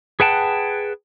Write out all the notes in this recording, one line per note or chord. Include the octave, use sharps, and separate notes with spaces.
G#4 B4 F#5 G5 A5